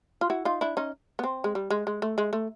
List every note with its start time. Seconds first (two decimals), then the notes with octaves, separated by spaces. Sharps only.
0.21 F4
0.30 E4 F#4
0.45 D#4 F4
0.61 D4 E4
0.77 C#4 D#4
1.19 B3
1.23 C4
1.44 G#3
1.55 G3
1.70 G#3
1.87 G#3
2.02 A3
2.18 G#3
2.33 A3